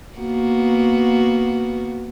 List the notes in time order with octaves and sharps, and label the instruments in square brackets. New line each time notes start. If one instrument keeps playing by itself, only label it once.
[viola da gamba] A#3 B3 F#4